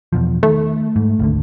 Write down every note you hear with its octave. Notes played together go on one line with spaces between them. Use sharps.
E2 B2 F3
D#3 A3
G#2
G#1 D2 D3